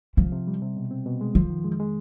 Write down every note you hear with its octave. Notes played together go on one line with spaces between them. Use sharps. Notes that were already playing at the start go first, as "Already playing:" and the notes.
C3 F3
C3
G3
C3
B2
C4
B2
G#3
F2 F3
D#3
G#3
G#3